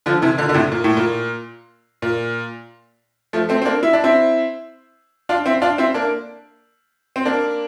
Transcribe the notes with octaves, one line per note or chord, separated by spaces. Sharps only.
D3 F3
C3 E3
A#2 D3
D3
A2 C3
A#2
A2
A#2
A#2
F3 A3
A3 C4
C4
A#3 D4
E4
D4
C4 E4
D4 F4
C4 E4
D4 F4
C4 E4
A#3 D4
C4
A#3 D4